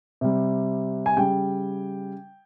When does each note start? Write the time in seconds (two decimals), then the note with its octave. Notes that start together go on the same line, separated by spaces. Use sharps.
0.21 C3 G3
1.06 G#5
1.17 C#3 G3 G5